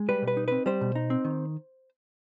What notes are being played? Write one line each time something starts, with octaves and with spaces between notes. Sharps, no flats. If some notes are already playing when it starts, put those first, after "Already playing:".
Already playing: G#3
G3 B4
B2
B4
D#4
C4 B4
G3 C5
B2
D#4
C4
D#3